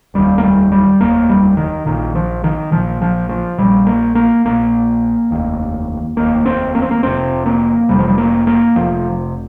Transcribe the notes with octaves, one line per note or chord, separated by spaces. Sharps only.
F1 D#2 G3
A#3
G3
G3
F1 D#2 A#3
G3
D#3
A#1 A#2 D#3
F3
D#3
A#1 A#2 F3
F3
F3
A#1 A#2 G3
A#3
A#3
A#1 A#2 A#3
F1 D#2
F1 D#2 A#3
C4
A#3
C4
A#3
F1 F2 C3 C4
A#3
F1 F2 C3 G3
F3
G3
A#3
A#3
F1 F2 C3 F3